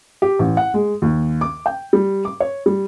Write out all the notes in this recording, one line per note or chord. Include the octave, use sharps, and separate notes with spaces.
G4
A1
F#5
G#3
D#2
D6
G5
G3
D6
C#5
G3